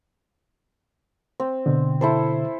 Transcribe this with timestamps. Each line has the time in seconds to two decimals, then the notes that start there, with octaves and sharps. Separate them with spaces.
1.40 C4
1.66 B2 D3
2.01 E4 A4 C5